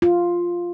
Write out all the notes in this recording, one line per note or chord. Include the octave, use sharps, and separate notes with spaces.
F4